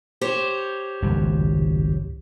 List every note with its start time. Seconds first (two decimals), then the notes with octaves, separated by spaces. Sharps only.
0.21 G4 C5 C#5
1.02 G#1 C#2 F#2